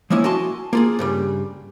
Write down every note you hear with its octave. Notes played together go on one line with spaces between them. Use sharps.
F3 G#3 A#3 C#4 E4
F#4 G#5 A5 C6
A#3 F4 G#4
G2 C#3 G3